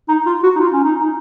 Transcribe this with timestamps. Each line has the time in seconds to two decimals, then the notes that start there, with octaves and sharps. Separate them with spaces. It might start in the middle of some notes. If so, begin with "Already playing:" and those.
0.08 D#4
0.26 F4
0.43 F#4
0.56 D#4
0.60 F4
0.73 C#4
0.84 D#4
1.00 D#4